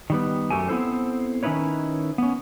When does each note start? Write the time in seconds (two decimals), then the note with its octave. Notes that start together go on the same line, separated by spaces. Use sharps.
0.10 D#3 G3 B3
0.50 F#2 F#3 A3 G4 G#5
0.68 B3 C4 E4 A4 C5
1.43 D#3 C#4 D#4 E4 B4 C#5
2.18 B3 C#4